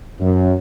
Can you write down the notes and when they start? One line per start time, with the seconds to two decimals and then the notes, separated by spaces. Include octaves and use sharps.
0.19 F#2